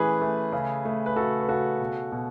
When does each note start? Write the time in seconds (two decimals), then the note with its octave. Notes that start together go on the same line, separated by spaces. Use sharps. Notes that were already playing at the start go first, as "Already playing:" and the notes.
Already playing: E3 A3 C#4 G#4 B4
0.21 A3
0.53 C#3
0.85 A3
1.06 B4
1.16 C#3 F#4 A4
1.41 B4
1.48 C#3 F#4 A4
1.80 B2
2.12 B2